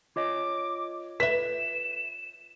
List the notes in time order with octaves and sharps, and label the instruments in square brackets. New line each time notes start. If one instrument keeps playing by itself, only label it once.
[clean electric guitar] F4 C#5 D#5 [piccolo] D6
[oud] B4 E5 [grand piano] B6 [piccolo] E7